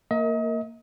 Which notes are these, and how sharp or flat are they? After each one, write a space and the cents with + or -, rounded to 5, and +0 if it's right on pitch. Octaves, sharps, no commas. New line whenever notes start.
A#3 -20 A#4 +0 D#5 +35